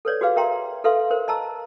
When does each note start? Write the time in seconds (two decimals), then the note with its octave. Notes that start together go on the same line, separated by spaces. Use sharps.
0.05 A4 B4 C#5 D5
0.21 F#4 G#4 B4 F5
0.36 A#4 E5 G5 A#5 C6
0.84 A4 B4 E5 F5 C6
1.10 A#4 C5
1.28 D#5 A5 A#5 E6